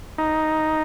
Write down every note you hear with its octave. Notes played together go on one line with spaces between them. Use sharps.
D#4